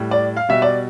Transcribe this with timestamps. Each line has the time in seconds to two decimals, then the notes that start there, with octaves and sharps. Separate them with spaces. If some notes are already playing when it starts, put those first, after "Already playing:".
Already playing: A2 G3
0.11 D5
0.37 F5
0.49 B2 G3 E5
0.62 D5